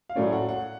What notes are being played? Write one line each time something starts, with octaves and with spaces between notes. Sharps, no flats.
F5
A2 F#3 A3 C#4 D5
F#5
F#5